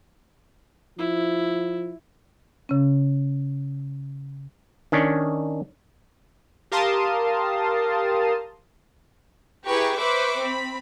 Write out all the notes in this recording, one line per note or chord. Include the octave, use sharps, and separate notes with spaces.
F3 E4
C#3 C#4
D#3 C#4 D4
G4 A#4 F5 A5 C6 D#6
E4 G4 G#4 B4 A#5 C#6
B4 C5 E5 B5 C#6 D6
C4 B5